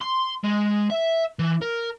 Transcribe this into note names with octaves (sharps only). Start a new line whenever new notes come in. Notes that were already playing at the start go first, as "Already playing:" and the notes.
C6
G#3
E5
E3
A#4